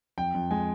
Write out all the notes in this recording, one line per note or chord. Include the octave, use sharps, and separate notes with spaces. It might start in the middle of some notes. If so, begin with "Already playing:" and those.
F2 G5
F2
G#3 G#5